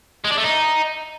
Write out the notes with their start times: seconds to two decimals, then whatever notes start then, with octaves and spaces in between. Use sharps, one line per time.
0.24 G#3
0.31 D4
0.37 A3
0.44 D#4